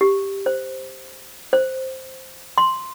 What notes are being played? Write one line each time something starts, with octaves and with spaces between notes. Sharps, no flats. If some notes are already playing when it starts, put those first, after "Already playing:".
G4
C5
C5
C6